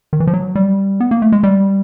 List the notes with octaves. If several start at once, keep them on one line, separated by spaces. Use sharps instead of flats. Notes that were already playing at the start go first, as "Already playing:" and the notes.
D#3
E3
F3
F#3
G3
B3
A#3
A3
G#3
G3